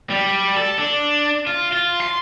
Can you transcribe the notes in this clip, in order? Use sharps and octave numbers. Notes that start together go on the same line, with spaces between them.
G3
A4
D4
F4
F4
C6